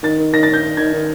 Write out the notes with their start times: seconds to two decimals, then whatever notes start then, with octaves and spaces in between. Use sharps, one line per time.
0.03 D#3 A6
0.18 D#3
0.33 D#3 A#6
0.43 A6
0.49 D#3
0.54 G6
0.63 D#3
0.77 D#3 G#6
0.93 D#3